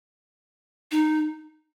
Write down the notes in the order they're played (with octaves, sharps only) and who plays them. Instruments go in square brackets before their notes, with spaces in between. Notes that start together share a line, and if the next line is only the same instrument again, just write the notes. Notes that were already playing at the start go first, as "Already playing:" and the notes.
[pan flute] D#4